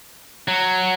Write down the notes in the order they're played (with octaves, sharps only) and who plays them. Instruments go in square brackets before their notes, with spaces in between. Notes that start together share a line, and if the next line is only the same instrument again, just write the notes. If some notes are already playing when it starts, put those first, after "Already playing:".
[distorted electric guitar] F#3